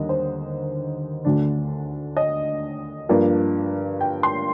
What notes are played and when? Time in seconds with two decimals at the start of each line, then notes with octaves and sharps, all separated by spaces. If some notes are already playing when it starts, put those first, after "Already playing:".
Already playing: D#2 D3 G3 D#5
0.09 C5
1.25 D2 D3 A3 D4
2.17 D#5
3.09 G2 F3 A#3 D4
4.01 G5
4.23 C6